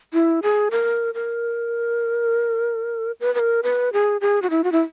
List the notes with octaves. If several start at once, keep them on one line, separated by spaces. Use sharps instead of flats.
E4
G#4
A#4
A#4
B4
B4
A#4
B4
G#4
G#4
F#4
E4
F#4
E4